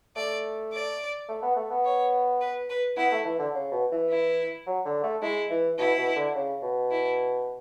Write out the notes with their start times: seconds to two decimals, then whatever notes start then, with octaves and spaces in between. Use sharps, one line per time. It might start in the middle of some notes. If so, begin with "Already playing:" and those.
0.16 A3 D5
0.73 D5
1.29 A3
1.43 B3
1.56 A3
1.71 B3
1.85 C#5
2.41 B4
2.69 B4
2.97 B3 E4
3.12 A3
3.25 E3
3.39 D3
3.54 C#3
3.72 B2
3.92 E3
4.10 E4
4.67 F#3
4.86 D3
5.03 A3
5.22 G#3 E4
5.50 E3
5.79 B2 E4
5.98 B2
6.16 D3
6.35 C#3
6.62 B2
6.91 E4